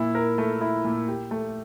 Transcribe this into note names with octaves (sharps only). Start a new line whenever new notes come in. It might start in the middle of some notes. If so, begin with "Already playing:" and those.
Already playing: A#2 E4
A#4
A3
E4
A#2
G4
A3